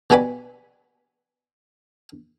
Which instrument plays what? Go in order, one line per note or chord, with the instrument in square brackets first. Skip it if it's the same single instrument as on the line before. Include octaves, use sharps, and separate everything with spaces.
[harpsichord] B2 G3 F#4 G#5 B5 D6